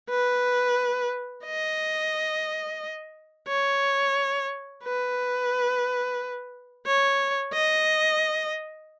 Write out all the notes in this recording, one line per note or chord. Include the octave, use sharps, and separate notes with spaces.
B4
D#5
C#5
B4
C#5
D#5